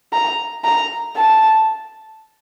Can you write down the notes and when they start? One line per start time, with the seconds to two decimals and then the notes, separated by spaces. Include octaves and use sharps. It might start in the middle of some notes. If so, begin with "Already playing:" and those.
0.13 A#5
0.65 A#5
1.16 A5